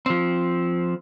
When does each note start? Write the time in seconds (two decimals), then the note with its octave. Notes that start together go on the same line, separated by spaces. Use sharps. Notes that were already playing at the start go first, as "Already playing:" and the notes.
0.06 F3 C4